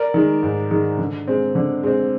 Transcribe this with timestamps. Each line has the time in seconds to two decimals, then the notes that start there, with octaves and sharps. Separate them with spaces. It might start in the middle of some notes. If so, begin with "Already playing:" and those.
Already playing: A#4 D5
0.14 D#3 G#3
0.43 G#2
0.71 D#3 G#3
0.98 D3
1.28 G#3 C4
1.55 D3
1.84 G#3 C4